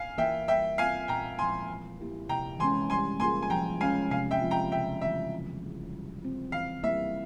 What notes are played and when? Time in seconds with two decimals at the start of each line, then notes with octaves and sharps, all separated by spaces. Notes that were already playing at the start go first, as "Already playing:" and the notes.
Already playing: F5 G#5
0.18 E3 A#3 F4 A#4 E5 G5
0.48 G3 E5 G5
0.78 C4 F4 A#4 F5 G#5
1.08 A#2 G5 A#5
1.39 F3 G#3 E4 G#5 C6
1.69 E3
1.99 A#3 E4 G4 A#4
2.29 C3 G5 A#5
2.59 E3 G#3 C#4 G#5 C6
2.90 G3 G#5 C6
3.20 A#3 F4 G#4 G#5 C6
3.43 G#5
3.50 F3 G5 A#5
3.80 G#3 C#4 F5 G#5
4.11 C3 F5 G#5
4.31 E5 G5
4.41 F3 A#3 F4
4.51 G5 A#5
4.71 C#3 E5 G5
5.01 E3 G3 C4 E5
5.32 E3
5.63 A#3 E4 G#4
5.92 G3
6.23 C4 F4
6.52 E3 F5
6.83 G3 A#3 E4 E5